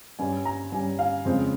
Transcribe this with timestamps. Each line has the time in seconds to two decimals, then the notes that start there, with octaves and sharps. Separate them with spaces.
0.19 G2 G3 C#4 G#5
0.45 A#5
0.72 G2 G3 C#4 G#5
0.99 F5
1.25 F2 C#3 G#3 C4